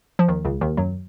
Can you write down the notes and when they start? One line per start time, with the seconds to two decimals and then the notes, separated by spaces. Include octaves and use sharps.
0.19 F3
0.28 D#2 D#3
0.45 C#2 C#3
0.61 D#2 D#3
0.77 F#2 F#3